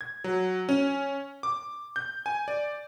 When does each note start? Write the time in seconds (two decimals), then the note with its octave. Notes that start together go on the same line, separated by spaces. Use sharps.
0.01 G#6
0.24 F#3
0.69 C#4
1.43 D6
1.96 G6
2.26 G#5
2.48 D5